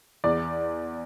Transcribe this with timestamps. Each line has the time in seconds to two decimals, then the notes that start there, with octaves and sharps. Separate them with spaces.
0.24 E2 D5